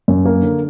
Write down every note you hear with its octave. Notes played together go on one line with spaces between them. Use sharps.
F#2
A#3
D3